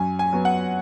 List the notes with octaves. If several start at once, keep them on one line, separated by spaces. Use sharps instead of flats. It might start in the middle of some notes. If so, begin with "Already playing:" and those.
Already playing: F#2 G#5
G#5
F#3 B3
F#5